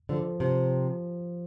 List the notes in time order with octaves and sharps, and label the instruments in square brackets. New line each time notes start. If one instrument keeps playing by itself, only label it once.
[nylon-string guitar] D3 [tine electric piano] F3
[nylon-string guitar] C3 [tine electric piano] F3